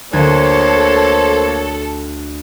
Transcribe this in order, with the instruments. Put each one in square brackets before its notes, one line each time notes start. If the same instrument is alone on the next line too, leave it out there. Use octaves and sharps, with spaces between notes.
[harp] D2 G#6 [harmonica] A#3 C5 [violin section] A4 [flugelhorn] C#5